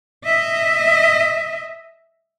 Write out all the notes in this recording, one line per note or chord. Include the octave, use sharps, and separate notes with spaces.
D#5 E5